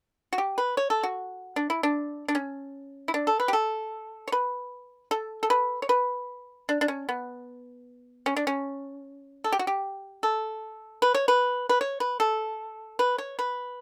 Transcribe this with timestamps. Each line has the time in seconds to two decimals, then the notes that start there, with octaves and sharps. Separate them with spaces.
0.33 F#4
0.38 G4
0.58 B4
0.77 C#5
0.90 A4
1.03 F#4
1.56 D4
1.70 E4
1.83 D4
2.28 D4
2.35 C#4
3.08 E4
3.14 D4
3.27 A4
3.40 B4
3.48 G4
3.53 A4
4.28 C#5
4.32 B4
5.11 A4
5.43 A4
5.50 B4
5.82 C#5
5.89 B4
6.69 D4
6.81 D4
6.88 C#4
7.09 B3
8.26 C#4
8.36 D4
8.47 C#4
9.44 A4
9.52 G4
9.59 F#4
9.67 G4
10.23 A4
11.02 B4
11.14 C#5
11.28 B4
11.69 B4
11.81 C#5
12.00 B4
12.20 A4
12.99 B4
13.18 C#5
13.39 B4